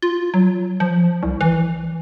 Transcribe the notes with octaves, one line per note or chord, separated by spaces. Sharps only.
F4
F#3
F3
C2
E3